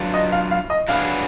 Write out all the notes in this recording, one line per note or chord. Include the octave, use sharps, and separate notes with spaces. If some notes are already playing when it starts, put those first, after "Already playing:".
Already playing: F#3 D4 F4 B4
D#5
F5
F5
D#5
F#3 D4 G#4 B4 F5